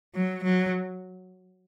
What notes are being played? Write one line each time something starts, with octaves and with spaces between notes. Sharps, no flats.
F#3
F#3